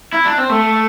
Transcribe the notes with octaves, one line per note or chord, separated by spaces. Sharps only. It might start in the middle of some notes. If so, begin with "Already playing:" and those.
E4
D4
C4
A3